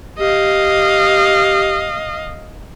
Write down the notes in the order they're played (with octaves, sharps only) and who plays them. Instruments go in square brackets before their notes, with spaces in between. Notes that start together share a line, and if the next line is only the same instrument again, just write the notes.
[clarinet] G4 [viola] D#5 F5